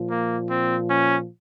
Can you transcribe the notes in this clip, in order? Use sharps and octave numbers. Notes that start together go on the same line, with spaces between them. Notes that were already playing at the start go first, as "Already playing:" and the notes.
Already playing: A#2 F3
A#3
C4
C#4